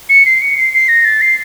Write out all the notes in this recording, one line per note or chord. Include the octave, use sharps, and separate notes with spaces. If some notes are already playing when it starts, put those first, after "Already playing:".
C#7
C7
C#7
C7
C7
A#6
A6
C7